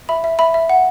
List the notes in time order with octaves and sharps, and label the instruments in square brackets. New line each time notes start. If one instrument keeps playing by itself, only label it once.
[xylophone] E5 B5
E5
E5 B5
E5
F#5